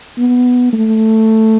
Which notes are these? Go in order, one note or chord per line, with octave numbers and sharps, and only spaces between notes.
B3
A3